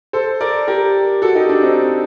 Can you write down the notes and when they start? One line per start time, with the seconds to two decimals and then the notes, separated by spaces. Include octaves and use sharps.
0.13 A4 C5
0.41 A#4 D5
0.68 G4 A#4
1.22 F#4 A4
1.35 D#4 G4
1.49 D4 F#4
1.63 C4 D#4